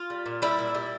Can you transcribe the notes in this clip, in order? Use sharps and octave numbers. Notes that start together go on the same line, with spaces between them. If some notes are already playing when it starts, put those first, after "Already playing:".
Already playing: F4
G3
A#2
G3 E4
A#2
G3